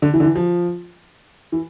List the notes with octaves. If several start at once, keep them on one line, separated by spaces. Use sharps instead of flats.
D3
E3
D3
E3
F3
E3